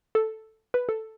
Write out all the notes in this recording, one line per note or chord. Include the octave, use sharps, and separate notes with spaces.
A4
B4
A4